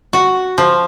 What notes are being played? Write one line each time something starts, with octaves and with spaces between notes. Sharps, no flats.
F#4
F3